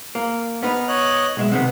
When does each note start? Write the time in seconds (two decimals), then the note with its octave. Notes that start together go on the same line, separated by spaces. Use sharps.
0.15 A#3
0.63 B3 D#4 B4 F6
0.88 C#5 D#5 F#6
1.37 B1 G#3 E5
1.52 C3 D#3 B3 F#5